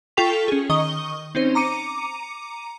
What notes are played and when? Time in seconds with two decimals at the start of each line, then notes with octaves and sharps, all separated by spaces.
0.17 F4 A4 G5 C#6 B6 F7
0.48 C#4 G#4
0.70 D#3 D#5 C#6 D#6 G7
1.35 C4 C#4 D#4 C5
1.55 A#5 D6 C#7 D#7